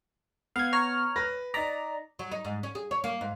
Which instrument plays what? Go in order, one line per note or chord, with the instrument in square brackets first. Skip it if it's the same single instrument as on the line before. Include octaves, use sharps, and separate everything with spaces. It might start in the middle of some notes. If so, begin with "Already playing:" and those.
[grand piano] B3 [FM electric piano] F5 G#6
[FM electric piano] C#5 A#5 F6
[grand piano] B4 B5 A#6
[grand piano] D#4 B6 [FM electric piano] D5 A#5
[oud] F#3
D#4
G#2
C#4
G#4
C#5
A#3
G#2